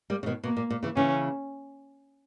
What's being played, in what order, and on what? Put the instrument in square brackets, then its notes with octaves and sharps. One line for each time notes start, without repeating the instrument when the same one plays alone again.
[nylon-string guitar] G3 A#3
C#3
B2 D#3
[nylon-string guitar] B2 [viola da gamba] A#3
[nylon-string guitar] A#2
A#2
C#3 E3
[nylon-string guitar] C#3 E3 [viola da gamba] C#4